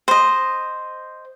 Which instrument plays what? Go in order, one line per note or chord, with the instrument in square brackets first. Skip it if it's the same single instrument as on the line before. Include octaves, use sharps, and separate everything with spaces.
[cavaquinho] C5 D#5